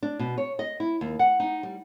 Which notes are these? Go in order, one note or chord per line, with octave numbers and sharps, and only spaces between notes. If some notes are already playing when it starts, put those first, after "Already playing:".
D4
B2
C#5
D#5
E4
D#2
F#5
D#4
G3